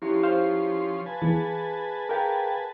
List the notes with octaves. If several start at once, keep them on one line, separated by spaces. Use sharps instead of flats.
F3 C#4 E4 G4 C6
C5 F5
B4 G#5 A5
E2 E3 G#4
G#4 A#4 F5 G5